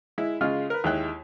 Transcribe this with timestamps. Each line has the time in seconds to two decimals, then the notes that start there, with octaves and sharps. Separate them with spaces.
0.18 G#3 E4
0.41 C#3 G#3 F4 F6
0.70 A#4 B4
0.84 D#2 G#3 E4 G5 F#6